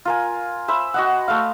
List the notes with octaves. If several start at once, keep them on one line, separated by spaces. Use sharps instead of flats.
F4 A#4 G#5
C5 E5 B5
F#4 D#5 F#5
A3 F5